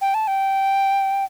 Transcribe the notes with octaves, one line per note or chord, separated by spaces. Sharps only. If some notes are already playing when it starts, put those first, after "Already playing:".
G5
A5
G5